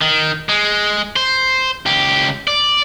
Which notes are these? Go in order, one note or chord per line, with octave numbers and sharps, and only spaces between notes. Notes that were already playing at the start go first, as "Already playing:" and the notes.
D#3
G#3
C5
C#2 G4
D5